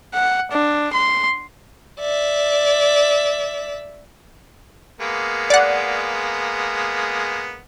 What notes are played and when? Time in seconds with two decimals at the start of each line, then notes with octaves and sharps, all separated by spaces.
0.14 F#5
0.52 D4
0.93 C6
2.00 D5 E5
5.01 G#3 A#3 B3
5.50 D5 F#5